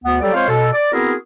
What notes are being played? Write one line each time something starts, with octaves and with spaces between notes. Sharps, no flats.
D2 B3
F#3 G3 G4 A4 D5
G#3 C4 F4 C5 C#5 F5
B2 A4
D5
B3 C4 E4 F#4 G#4 A#4